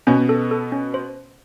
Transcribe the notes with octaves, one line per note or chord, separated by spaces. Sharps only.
B2 B3 C#4
A4
A4
C#4
C5